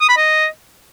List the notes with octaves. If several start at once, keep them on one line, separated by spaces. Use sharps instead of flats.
D#6
B5
D#5